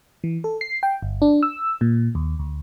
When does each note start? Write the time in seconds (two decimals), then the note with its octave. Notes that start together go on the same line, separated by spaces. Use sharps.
0.24 E3
0.44 A4
0.61 C7
0.83 G5
1.02 G1
1.22 D4
1.43 E6
1.81 A#2
2.15 D#2
2.39 D2